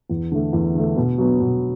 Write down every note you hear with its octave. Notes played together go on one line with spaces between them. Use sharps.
E2
D3 A3
E2
D3 A3
B2
F#3 B3
B2